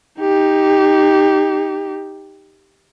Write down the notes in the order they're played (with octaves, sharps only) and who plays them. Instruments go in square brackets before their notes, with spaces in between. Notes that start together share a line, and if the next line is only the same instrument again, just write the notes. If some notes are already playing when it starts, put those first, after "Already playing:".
[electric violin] D#4 G4